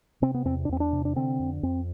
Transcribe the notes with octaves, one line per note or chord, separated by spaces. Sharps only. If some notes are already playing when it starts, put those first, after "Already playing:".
C3 C4
B3
E2 C4
D4
E2 C4
D4
C3
D4
D3 C4
F2
F2 C4